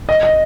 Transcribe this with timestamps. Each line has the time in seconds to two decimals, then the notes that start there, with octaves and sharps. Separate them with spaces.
0.09 D#5
0.23 D#5